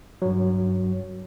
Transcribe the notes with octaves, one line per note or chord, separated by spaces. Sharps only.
G2 F#3